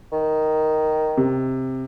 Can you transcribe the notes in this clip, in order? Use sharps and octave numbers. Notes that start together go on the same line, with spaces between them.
D#3
C3